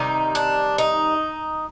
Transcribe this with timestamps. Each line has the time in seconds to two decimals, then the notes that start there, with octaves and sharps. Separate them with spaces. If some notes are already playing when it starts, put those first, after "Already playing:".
Already playing: C3 D#3 G3 D#4
0.35 D4
0.78 D#4